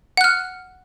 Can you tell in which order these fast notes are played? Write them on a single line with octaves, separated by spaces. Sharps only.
F#5 F#6 F6